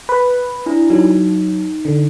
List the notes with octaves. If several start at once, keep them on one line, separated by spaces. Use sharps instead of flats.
B4
D4 E4
F#3 D#4
D3